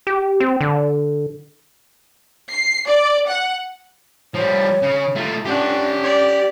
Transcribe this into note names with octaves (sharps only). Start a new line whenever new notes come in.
G4
C4
D3
C7
D5
F#5
F3 G3 C#5
C#3
A3 F4
C#4 D4 G4 F#5
D5